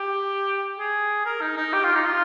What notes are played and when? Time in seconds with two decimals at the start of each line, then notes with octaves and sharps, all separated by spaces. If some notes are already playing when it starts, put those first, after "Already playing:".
Already playing: G4
0.79 G#4
1.25 A#4
1.41 D#4
1.57 D#4
1.73 G4
1.84 F4
1.95 D#4
2.05 F4